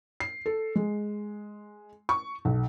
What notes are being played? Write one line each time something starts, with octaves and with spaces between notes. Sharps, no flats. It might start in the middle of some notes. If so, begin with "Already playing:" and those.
C7
A4
G#3
C#6
B1